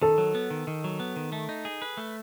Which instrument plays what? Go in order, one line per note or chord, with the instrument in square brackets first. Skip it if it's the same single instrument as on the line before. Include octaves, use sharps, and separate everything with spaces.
[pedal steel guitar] D#3 [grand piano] A4
[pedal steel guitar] F#3
B3
D#3
D#3
F#3
B3
D#3
A3
D#4
G#4
B4
A3